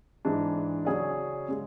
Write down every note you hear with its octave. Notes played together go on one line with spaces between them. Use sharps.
G#2 E3 G#3 D4
C#3 F#3 C#4 G#4 D5
C#3 G#3